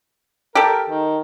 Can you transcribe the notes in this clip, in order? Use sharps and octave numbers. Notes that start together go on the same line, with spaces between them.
G4 A4 A#4
D#3